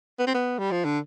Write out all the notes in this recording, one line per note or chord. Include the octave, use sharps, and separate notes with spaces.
B3
C4
B3
G3
F3
D3